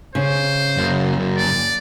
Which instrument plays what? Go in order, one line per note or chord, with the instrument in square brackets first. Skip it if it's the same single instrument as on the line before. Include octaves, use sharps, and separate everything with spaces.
[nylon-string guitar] C#3 [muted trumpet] C5
[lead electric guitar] F#2 A#3
[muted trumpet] D5